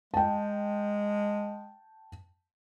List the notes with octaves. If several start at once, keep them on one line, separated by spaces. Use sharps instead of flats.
G#3 G5 A5